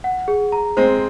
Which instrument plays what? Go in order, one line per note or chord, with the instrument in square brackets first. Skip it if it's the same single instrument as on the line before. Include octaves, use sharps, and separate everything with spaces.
[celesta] F#5
G#4
A#5
[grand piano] G#3 C4 [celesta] C5